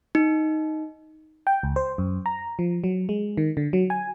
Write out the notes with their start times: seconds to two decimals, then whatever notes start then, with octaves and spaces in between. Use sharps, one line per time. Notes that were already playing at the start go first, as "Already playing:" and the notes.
0.15 D#4
1.47 G5
1.63 C#2
1.76 C5
1.98 F#2
2.26 A#5
2.59 F3
2.84 F#3
3.09 G#3
3.37 D#3
3.57 D3
3.73 F#3
3.90 G#5